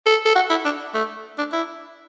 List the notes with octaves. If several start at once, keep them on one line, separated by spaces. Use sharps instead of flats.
A4
A4
F#4
E4
D4
A3
D4
E4